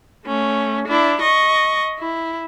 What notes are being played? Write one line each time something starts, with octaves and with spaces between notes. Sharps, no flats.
A3 C#4
D4 E4
D#5 C#6
E4